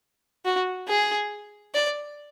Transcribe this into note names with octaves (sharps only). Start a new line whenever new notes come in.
F#4
G#4
D5